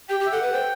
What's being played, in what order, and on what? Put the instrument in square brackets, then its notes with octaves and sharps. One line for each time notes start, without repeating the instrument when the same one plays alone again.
[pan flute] G4 [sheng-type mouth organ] G5
[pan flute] G4
[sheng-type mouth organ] E5
[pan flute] A4 [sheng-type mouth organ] F#5
[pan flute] B4
[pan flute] C5 [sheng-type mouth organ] G5